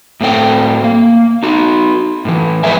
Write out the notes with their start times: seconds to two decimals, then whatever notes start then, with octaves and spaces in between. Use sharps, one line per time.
0.21 A2 A3 C4 G4 G5
0.84 A#3
1.43 D#4 F#4
2.25 A2 E3
2.64 F2 G#3 B4 E5 G#5